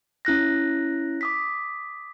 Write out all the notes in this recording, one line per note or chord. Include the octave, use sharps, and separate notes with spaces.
C#4 E4 F#6 A#6
D6 D#6 B6